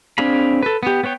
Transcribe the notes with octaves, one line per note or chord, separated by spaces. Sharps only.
C4 D4 G#4 F5 B5
A4 B4
B3 G4
B3 B4 C#5 G5